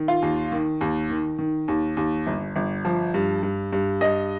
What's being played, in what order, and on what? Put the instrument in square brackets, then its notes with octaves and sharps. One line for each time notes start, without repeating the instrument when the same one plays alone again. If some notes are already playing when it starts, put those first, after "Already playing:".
Already playing: [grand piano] D#3
F4
D#2
D#3
D#2
D#3
D#3
D#2
D#2
G1
G1
F3
G2
G2
G2
G2 D#5